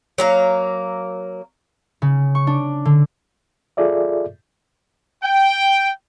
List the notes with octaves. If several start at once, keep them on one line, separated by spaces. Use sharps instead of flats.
F#3 A#3 F5
C#3
C#6
D4
D3
F4 G#4 A4 D5 E5
G5